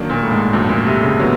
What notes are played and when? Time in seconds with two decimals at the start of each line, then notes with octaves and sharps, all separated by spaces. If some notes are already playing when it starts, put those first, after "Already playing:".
Already playing: D#3 F#3 A#3 D4
0.10 A#2
0.23 A2
0.31 G#2
0.53 F2 A2 D3 F#3 A3 C4
0.69 A#2
0.86 C3
1.03 C#3
1.19 D3 F#3 B3